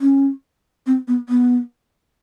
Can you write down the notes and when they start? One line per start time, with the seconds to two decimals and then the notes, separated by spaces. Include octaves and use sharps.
0.01 C#4
0.87 C4
1.08 B3
1.29 B3